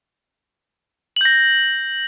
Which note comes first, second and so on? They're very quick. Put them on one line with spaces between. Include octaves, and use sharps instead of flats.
F#7 G6 A#6